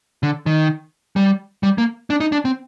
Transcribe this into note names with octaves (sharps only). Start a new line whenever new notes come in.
D3
D#3
G3
G3
A#3
D4
D#4
D4
C4